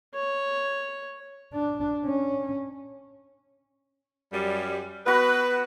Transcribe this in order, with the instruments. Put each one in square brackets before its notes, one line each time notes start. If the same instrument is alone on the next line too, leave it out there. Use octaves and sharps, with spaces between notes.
[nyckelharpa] C#5
[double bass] D4
C#4
[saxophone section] F#2 G3
[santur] B3 F#4 [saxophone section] B4